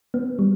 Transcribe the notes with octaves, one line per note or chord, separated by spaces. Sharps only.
B3
G3